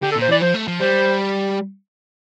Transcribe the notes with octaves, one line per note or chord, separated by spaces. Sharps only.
D3 G4
A4
A#2
C5
E3 D5
F3 C5
A3
F3
G3 C5